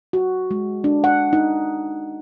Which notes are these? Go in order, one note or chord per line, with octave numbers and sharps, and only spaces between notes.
F#4
G#3
D4
F#5
D#4